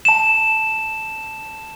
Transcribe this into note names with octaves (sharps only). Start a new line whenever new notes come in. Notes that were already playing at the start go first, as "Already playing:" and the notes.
A5 E7